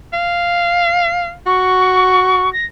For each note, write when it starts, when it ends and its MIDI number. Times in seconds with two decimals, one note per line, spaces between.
0.13 1.33 77
1.46 2.51 66
1.46 2.52 85
2.53 2.65 94